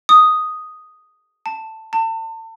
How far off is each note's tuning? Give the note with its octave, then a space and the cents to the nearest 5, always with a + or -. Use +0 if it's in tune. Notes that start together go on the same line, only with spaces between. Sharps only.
D#6 +0
A5 +10
A5 +35